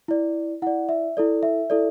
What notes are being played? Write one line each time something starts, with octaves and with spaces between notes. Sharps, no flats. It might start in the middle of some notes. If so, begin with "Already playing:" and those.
E4 D5
E4 D5 F#5
E5
E4 A4 D5
E5
E4 A4 D5